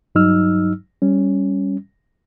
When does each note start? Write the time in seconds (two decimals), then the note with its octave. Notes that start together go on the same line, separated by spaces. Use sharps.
0.15 G2 F#3 D#4 E6 F6
1.02 G3 C#4